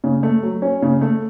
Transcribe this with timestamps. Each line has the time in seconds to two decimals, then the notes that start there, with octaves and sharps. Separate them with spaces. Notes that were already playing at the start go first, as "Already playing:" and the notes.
0.04 C#3
0.23 A3
0.43 F#3
0.62 C#4
0.82 C#3
1.01 A3